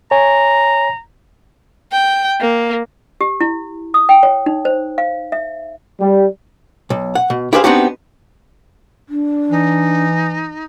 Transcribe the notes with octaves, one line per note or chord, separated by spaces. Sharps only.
C#5 G#5 A#5
G5
A#3
G4
E4
D#6
G5
C#5
D#4
C5
F5
E5
G3
B1
F#5
B2
E4 G4 G#4 B4 C5 F5
B3 C4 D4 D#4 F#4 G4
D4
E3 D#4